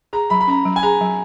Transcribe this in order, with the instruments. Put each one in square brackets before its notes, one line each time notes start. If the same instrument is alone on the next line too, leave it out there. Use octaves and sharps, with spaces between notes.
[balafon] G#4 [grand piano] A#5
[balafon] F#3 [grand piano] B5
[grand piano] B5
[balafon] C#4 [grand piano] A#5
[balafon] F#3
[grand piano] G#5
[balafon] G#4 [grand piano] A#5
[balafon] F#3